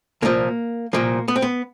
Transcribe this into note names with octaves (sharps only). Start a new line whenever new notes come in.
C2 A#2 F3 A#3
C2 A#2 F3 A#3
B3
C4
B3